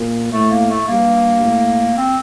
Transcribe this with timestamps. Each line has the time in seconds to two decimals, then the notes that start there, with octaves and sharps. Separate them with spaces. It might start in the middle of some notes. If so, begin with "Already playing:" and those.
Already playing: A#2
0.33 A2 A3
0.51 A#3
0.70 A3
0.88 G2 A#3
1.42 A2
1.97 C4